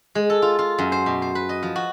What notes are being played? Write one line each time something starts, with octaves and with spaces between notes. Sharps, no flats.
G#3
A4
F4
F4
F#2
C5
B2
C5
B4
D#5
F3
F#4